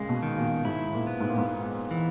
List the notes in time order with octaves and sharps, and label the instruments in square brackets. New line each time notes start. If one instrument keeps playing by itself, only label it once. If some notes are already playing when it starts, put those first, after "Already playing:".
Already playing: [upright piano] A#2 C#3 [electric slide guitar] G#3
[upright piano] B2
[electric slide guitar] D#3
[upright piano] A#2
[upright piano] G#2 [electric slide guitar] E4
[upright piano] A#2
[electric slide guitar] B3
[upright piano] G#2
A#2
G#2
[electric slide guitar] B3
E3